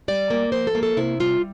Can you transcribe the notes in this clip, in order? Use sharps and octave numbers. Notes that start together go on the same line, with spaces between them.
G3 D5
A#3
F3 C5
A4
A#3
A4
C3 E4
G3 F4